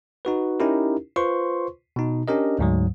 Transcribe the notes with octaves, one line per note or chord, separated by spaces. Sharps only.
D#4 F#4 B4
C#4 D#4 E4 G4 A#4
F4 B4 C5 C6 C#6
B2 D#4
C#4 D4 G4 A#4 D#5
D2 G#2 F#3